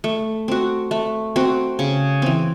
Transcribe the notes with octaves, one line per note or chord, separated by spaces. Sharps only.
A3
C4 F#4
A3
C4 F#4
C#3
E3 C4